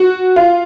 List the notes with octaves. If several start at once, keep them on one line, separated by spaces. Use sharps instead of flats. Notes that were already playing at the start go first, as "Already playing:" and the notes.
Already playing: F#4
F4